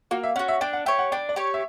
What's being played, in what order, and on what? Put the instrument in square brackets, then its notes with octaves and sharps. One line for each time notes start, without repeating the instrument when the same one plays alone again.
[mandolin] A#3 [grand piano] F#4
[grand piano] E5
[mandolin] C#4 [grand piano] F#5
[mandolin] F#4
[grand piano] E5
[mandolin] D4 [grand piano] G5
[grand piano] F#5
[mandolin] G4 C#5 [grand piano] E5
[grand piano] F#5
[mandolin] D4 [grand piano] G5
[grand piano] D5
[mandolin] G4 C#5
[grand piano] E5